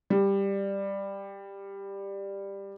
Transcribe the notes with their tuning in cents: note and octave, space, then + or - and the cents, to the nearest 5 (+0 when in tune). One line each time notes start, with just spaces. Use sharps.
G3 +10